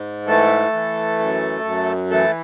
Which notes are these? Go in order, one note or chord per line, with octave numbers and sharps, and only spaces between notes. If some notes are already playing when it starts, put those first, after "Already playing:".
Already playing: G#2
E3 A3 A4
E3
F#2
F#2
E3 A3 A4